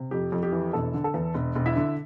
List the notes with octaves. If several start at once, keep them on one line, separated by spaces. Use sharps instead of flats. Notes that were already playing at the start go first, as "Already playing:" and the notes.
Already playing: C3
F2 G4
F2
G4
E3
E1 A4
D3
A4
E2
E1
E1
E4 E5
D3